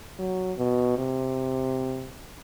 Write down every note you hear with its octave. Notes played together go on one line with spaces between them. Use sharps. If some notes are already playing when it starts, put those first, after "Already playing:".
F#3
B2
C3